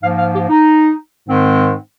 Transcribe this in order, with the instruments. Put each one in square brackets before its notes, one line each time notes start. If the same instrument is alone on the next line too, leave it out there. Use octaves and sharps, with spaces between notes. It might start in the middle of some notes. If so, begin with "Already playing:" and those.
[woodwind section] G#2 F3 A#3 F5
F5
G4
D#4
G#2 D#3 G#3 C4